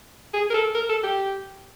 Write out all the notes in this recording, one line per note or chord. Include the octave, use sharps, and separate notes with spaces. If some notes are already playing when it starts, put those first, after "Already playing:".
G#4
A#4
A4
A#4
A4
G4